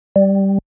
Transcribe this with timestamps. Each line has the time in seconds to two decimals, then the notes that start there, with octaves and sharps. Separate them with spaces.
0.16 G3